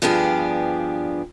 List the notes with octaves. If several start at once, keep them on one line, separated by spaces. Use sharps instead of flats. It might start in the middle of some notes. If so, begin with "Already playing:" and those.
G2 F3 B3 D4 G4 G#4